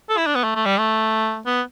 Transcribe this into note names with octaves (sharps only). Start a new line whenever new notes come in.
A4
E4
D4
B3
A3
A3
G3
A3
B3